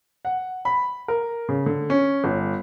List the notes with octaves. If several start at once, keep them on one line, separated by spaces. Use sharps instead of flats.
F#5
B5
A#4
C#3
D3
C#4
G1